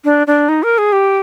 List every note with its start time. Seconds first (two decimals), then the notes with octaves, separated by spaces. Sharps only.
0.05 D4
0.27 D4
0.49 D#4
0.63 A#4
0.78 G#4
0.92 G4